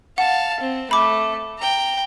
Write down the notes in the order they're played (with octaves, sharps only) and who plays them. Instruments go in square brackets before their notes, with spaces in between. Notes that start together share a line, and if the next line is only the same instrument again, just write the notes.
[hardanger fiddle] F5 A5 [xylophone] F#5
[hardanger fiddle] C4
[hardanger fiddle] A3 [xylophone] B5 D6
[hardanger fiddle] G5 A#5